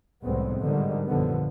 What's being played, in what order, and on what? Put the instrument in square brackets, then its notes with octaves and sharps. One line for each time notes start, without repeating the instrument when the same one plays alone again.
[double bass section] F1 C2 A2 G#3 B3 C4
G#2 D3 D#3 F3 G3
A#1 F#2 D3 F3 B3